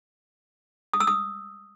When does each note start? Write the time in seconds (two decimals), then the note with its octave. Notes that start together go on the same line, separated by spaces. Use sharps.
0.94 D#6
1.00 E6
1.07 D#6